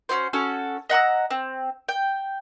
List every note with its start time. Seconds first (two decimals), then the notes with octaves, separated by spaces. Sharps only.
0.09 C#4 E4 F#4 C5
0.33 C#4 F#4 A4
0.90 D#5 F#5 A#5 E6
1.30 C4
1.89 G5